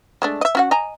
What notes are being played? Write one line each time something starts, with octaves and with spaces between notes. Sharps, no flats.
G#3 A3 D4
D#5 E5
C#4 F#4 F#5
D#5 G#5 A#5